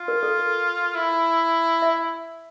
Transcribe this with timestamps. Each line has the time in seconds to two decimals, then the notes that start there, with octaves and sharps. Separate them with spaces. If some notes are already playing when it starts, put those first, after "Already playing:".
Already playing: F4
0.08 A#4
0.23 A4
0.95 E4
1.82 E5